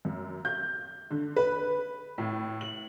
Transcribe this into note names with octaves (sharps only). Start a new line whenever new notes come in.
F#2
G6
D3
B4
A2
F#7